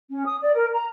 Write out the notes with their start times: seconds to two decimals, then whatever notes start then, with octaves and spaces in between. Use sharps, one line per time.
0.10 C#4
0.25 D#6
0.41 D5
0.55 A#4
0.72 A#5